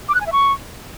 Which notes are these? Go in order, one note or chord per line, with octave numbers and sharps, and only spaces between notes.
D6
F#6
G#5
E5
C#6